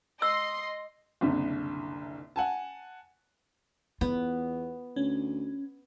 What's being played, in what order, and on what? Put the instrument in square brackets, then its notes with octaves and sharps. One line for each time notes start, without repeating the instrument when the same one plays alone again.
[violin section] D#5 C6 [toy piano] E6
[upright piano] F#1 C2 D3
F#5 G#5 A5
[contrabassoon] E2 [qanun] B3 [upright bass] F4
[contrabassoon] D2 [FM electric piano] C#4